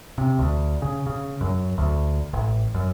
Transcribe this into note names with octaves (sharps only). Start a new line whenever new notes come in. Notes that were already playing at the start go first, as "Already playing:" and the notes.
C3
D2
C#3
C#3
F#2
D2
A1
F#2